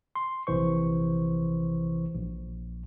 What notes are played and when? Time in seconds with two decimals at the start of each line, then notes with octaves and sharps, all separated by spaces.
0.15 C6
0.47 A#1 C3 E3 C5 C#6
2.14 A#1